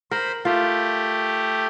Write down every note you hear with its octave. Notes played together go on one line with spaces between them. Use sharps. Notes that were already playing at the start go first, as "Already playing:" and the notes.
A#4 C5 B5
A3 F4 G4